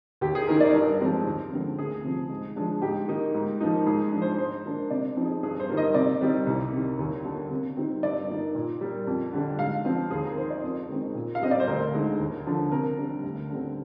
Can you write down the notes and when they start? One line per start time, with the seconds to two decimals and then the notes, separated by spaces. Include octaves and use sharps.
0.21 D#2 G4
0.35 G#4
0.48 D#3 A#3 D#4 A#4
0.61 D5
0.74 G2 A#4
1.00 F3 G#3 C4 D#4
1.26 D#2
1.52 D3 F3 G#3 C4
1.78 D2 G#4
2.04 C3 F3
2.30 G#2
2.56 F3 G#3 D4
2.82 G#2 G4
3.08 D#3 A#3 D#4
3.34 G#2
3.61 F3 A#3 D#4
3.86 G#2 G#4
4.12 F3 G#3 D4
4.22 C5
4.38 G#2 C5
4.65 D#3 A#3 D4
4.90 C3 D5
5.16 F3 C4 D#4
5.25 G#4
5.43 G2 G#4
5.60 C5
5.69 D#3 G3 A#3
5.77 D#5
5.94 C3 D5
6.21 D#3 G3 C4 D#4
6.47 C2
6.73 C3 D#3
6.99 D#2
7.25 D3 G3 A#3 D4
7.51 C3
7.77 D#3 G3 C4 D#4
8.03 G2 D5
8.29 D#3 A#3 D#4
8.55 A#2
8.81 G3 A#3
9.07 F2
9.33 D3 G3 D4
9.59 G#2 F5
9.85 F3 C4
10.11 D#2 G#4
10.24 A#4
10.37 D#3 A#3 C5
10.50 D5
10.63 F2
10.89 D#3 G#3 C4
11.15 A#2
11.35 F5
11.41 G3 C4 D#5
11.51 D5
11.60 C5
11.67 D2 A#4
11.93 D3 G#3 D#4
12.20 D#2
12.46 D3 F3
12.71 C3 A#4
12.98 G3 D4
13.24 D2
13.50 D3 G3 C4